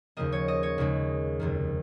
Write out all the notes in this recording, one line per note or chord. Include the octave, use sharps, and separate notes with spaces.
D#2 C#3 F3 A#3 D#5
C#5
D#5
C#5
D#2 C#3 G#3
F1 D#2 D#3